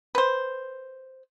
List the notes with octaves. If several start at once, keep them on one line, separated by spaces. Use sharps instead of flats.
B4 C5